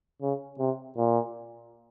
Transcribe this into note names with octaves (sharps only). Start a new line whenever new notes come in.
C#3
C3
A#2